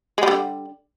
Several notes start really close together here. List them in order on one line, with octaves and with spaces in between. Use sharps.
G#3 G3 D3